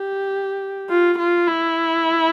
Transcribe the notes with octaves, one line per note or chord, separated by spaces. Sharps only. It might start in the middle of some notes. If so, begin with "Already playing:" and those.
Already playing: G4
F4
F4
E4